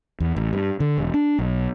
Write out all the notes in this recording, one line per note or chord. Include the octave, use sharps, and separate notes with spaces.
E2
A1
G2
D3
E1
D4
B1